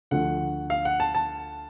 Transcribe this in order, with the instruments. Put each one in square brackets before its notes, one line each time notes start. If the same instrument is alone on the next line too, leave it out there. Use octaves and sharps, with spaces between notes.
[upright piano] D2 D3 F3 A3 [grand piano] F#5
[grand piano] F5
F#5
A5
A5